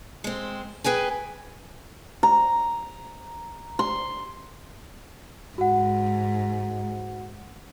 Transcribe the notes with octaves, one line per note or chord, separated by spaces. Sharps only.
G#3 C4
G#4 B4 G5 G#5
A#5
C6
G#2 F#4 F#5